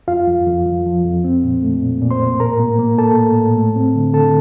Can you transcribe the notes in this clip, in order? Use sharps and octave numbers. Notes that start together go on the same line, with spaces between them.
F2 F4 F5
F2
F2
F3
F3
F2
C4
A#2
A3
A#2
A#2
C5 C6
A#2
A2 A#4 A#5
A#3
A#3
A#3 A4 A5
A2
A2
A3
C4
D3
D3 A4 A5